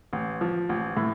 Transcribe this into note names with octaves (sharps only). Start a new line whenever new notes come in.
A1
F3
A1
A2